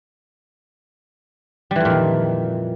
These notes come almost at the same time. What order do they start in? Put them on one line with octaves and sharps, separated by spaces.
G3 E3 F2 A#2 D#3